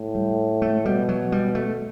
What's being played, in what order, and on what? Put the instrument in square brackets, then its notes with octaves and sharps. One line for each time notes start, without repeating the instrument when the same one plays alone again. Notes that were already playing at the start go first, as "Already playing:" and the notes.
Already playing: [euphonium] A2
[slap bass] G3
A3
[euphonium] B2 [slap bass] G3
[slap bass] F#3
G3
A3